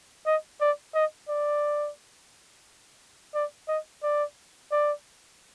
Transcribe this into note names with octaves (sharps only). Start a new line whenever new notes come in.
D#5
D5
D#5
D5
D5
D#5
D5
D5